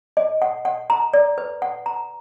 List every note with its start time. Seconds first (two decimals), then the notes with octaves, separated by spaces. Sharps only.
0.17 D#5
0.42 F#5
0.65 F#5
0.90 A#5
1.13 D5
1.38 B4
1.62 F#5
1.86 A#5